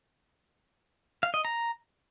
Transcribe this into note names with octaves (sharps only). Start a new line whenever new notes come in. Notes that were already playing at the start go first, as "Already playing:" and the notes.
F5
D#5
A#5